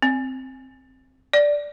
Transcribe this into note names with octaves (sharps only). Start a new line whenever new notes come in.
C4
D5